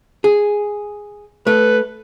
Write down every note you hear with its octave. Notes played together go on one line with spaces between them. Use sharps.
G#4
A3 B4